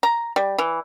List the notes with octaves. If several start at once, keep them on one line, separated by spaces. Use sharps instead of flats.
A#5
G3
E3